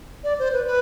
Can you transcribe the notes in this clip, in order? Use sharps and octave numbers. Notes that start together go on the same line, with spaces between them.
D5
C5
B4
B4